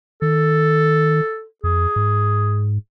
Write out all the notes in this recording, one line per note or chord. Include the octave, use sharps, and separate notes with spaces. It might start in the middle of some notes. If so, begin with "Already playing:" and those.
D#3 A4
F2 G#4
G#2